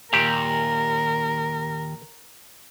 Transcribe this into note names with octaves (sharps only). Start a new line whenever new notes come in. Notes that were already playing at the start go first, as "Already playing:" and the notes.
D#2 A#2 G4 A#4